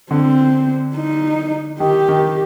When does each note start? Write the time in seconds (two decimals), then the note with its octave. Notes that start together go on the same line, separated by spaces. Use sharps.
0.11 D3 C4
0.96 D#4
1.80 D#3 G4
2.08 D#3